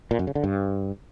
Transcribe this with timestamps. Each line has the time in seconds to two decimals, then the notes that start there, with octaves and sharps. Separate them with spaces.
0.11 A#2
0.19 F#2
0.27 C#3
0.35 D3
0.44 G2